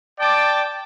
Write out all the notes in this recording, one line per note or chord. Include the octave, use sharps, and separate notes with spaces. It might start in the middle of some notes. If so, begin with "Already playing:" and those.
D5 G5 A5 D6